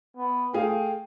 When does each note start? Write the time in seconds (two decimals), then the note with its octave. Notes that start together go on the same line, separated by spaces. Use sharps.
0.17 B3
0.53 A3 G#4 F5 G5